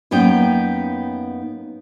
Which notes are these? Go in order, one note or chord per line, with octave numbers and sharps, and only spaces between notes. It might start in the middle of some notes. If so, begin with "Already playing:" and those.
F#2 A#3 B3 D#4 C#5 G5